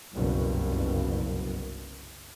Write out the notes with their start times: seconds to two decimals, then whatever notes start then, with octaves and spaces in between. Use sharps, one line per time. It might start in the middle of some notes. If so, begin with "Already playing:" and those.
0.15 F#1 C2 G2 B2